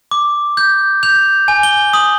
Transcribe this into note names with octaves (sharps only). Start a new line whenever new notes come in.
D6
G6
G6 F7
G#5
G7
D#6 F#7